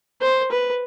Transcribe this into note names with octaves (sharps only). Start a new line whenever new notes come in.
C5
B4